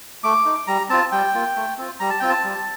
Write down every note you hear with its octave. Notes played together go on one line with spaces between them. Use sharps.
A3 D6
D#4
G3 A#5
C4 F4 A5
G3 G5
A#3 F4
A3
C4 F4
G3 A#5
A5
C4 F4 G5
A5
G3